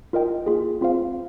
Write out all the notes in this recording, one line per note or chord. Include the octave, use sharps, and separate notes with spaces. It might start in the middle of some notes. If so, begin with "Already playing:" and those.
F4 A#4 D#5 G5
A#3 F4 G#4
C4 F4 C5 F5